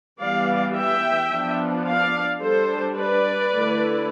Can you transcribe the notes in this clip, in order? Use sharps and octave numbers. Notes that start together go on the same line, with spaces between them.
E3 G3 B3 D5 F5
E5 G5
F3 B3 D4
D5 F5
G3 D4 A4 C5
B4 D5
D3 A3 E4